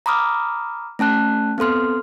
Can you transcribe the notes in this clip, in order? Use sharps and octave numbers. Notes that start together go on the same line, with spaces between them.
A#5 B5 D6 D#6 F6
A3 C#4 A5 F#6
B3 C4 A4 C6 F6